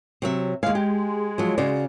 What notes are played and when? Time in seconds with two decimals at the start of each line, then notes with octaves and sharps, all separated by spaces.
0.22 C3 F#3 E5
0.63 D#2 G#3 F5
0.75 G4
1.38 F3 F#3
1.58 C#3 F#4 D5